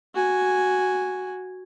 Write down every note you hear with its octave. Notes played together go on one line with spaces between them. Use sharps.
F#4 G#5